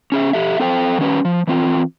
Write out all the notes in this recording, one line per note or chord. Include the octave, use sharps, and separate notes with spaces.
C#4 G#4 E5
G4 A4 E5
C4 A4 C5 G5
D#3 G3 C#4 B4
F3
E3 C4 F4